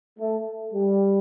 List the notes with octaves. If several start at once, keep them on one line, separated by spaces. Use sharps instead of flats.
A3
G3